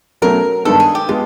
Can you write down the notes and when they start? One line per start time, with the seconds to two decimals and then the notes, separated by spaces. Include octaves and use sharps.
0.22 B2 F#3 A3 C#4 A#4
0.65 G2 D#3 G#3 B3 A4
0.80 G#4
0.95 G4
1.09 G#3 B3 F4